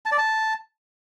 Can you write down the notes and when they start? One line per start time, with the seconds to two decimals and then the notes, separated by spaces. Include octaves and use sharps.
0.06 A5
0.12 D5
0.18 A5